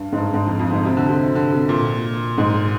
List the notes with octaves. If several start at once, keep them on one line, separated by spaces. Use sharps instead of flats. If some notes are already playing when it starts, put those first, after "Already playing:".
Already playing: G2
G#2
G2
G#2
F2
F2
G#2
C3
D3
C3
D3
C3
A#2
G#2